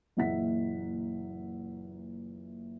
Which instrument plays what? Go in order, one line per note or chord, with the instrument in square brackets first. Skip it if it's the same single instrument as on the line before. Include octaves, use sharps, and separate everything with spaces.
[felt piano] F#1 A#2 E3 E5 F#5 B6